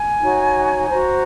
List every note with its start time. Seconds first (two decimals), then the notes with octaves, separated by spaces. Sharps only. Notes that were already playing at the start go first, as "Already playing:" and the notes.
Already playing: G#5
0.22 D#4 F#4 C#5
0.89 F#4 C5 A#5